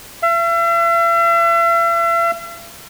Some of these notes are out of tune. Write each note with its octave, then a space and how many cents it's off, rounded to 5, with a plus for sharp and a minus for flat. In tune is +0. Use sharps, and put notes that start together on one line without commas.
E5 +40